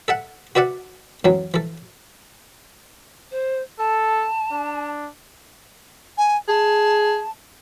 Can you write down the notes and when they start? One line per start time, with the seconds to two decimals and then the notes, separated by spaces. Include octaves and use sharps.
0.08 A4 E5 F#5
0.55 F#4 B4 D5 E5 F#5
1.25 F#2 E3 F#3
1.54 E3 A4
3.31 C5
3.79 A4 A5
4.52 D4
6.18 G#5
6.48 G#4 A5